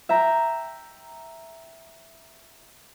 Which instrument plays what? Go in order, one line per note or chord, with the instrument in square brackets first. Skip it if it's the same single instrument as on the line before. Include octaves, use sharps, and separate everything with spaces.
[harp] E5 G5 A#5